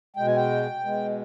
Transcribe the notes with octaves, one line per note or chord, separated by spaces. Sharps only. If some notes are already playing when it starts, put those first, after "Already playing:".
B2 G#3 G5
G#5
G5
B2 G#3